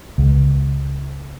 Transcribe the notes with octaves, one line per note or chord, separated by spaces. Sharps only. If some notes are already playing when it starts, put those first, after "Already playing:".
C#2